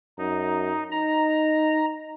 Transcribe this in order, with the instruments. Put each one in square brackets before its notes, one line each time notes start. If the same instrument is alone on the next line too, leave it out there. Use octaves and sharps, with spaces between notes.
[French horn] F#2 [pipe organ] D#4
[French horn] D#4 [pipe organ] A#5